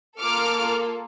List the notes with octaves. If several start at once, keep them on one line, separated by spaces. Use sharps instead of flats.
A#3 F4 A4 D6 F6